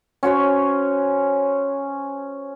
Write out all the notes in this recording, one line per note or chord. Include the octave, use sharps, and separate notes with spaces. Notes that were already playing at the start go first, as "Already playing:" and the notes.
C#4 F#4 C5 C#5